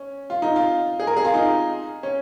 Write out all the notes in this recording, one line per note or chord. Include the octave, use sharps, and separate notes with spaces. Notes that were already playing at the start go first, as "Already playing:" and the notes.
Already playing: C#4
F4
D#4
F4
G#4
A#4
G#4
F4
D#4
C#4